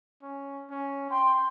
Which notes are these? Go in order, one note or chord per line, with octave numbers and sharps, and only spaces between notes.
C#4
C#4
G5 C6